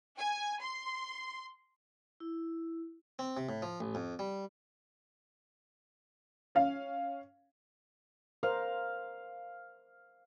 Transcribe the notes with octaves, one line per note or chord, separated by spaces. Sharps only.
G#5
C6
E4
C4
C3
A2
F3
A1
F2
G3
C#4 F5
A#4 C5 F5